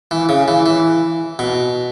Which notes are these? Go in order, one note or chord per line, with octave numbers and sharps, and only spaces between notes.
E3
C#3
E3
E3
B2